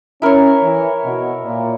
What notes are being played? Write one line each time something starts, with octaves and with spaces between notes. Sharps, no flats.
C#4 E4 A#4 C#5
E3
B2
A#2